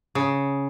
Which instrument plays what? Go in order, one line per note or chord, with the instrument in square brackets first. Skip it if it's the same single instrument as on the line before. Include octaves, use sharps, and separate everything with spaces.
[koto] C#3